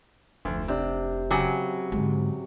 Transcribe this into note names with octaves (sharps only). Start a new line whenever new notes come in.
F1 D2 F3
C3 D4
C#3 F#3 G5 G#5 D6
G#2 D3